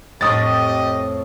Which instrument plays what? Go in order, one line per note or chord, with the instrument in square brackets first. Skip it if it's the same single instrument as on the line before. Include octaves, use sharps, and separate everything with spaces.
[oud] F2 A2 [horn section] G4 D#5 [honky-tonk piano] C#6 D#6 A6